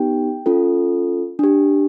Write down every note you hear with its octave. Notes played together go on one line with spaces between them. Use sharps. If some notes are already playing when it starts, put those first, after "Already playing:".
Already playing: B3 D#4 G4 G5
C#4 F4 A4
D4 G4